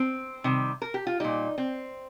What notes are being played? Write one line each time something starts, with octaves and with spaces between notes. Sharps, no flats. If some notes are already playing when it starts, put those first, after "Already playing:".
Already playing: C4
C3 D#3 G3
A#4
G4
F4
A#2 G3 D#4
C4